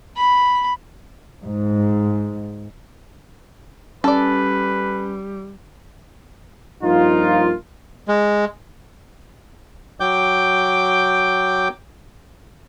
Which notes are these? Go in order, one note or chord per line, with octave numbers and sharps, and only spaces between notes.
B5
G#2
G3 C#4 A4 B4 D5
G2 F3 A#3 D#4 F4
G#3
F#3 G5 D6 G6